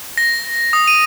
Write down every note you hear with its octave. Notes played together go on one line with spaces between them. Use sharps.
A#6
D#6
D#7